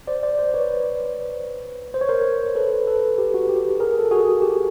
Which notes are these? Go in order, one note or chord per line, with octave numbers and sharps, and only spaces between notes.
C5 D5
C5 D5
C5 D5
B4 C#5
C5
C#5
A#4 C5
A4 B4
A4 B4
G4
F#4
G4
G#4 A#4
A4
F#4 G#4
G4